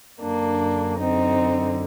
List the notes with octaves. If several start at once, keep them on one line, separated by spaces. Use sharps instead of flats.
F#2 D3 A#3 D4
C4 D#4